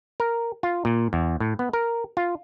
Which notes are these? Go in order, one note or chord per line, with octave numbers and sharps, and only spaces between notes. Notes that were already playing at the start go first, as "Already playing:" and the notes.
A#4
F4
A#2
E2
A2
B3
A#4
F4